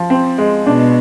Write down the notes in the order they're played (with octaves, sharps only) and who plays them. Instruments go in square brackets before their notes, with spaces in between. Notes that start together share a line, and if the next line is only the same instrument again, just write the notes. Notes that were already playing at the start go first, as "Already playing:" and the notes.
Already playing: [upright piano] F3
C4
G#3
[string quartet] B2 [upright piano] D4